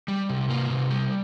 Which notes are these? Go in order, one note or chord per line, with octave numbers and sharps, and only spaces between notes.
G3
C3
A#3
C3
G3